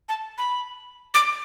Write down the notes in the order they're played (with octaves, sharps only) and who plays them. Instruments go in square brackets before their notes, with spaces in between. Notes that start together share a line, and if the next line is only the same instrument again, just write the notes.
[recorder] A5
B5
D6